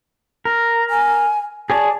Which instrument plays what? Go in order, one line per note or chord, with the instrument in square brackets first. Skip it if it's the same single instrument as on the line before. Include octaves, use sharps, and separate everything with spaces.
[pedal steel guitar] A#4
[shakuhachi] G#5
[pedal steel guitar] G#4 C#5 D5 [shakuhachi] A5